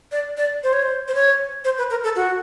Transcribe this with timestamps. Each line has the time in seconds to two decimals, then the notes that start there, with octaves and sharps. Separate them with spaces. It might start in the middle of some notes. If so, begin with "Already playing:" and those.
0.12 D5
0.37 D5
0.63 C5
0.73 C#5
0.82 C5
1.08 C5
1.15 C#5
1.65 C5
1.78 B4
1.90 A#4
2.04 A4
2.16 F#4